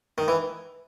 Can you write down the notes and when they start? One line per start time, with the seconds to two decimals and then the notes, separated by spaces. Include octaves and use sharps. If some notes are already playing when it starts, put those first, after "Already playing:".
0.18 D#3
0.28 E3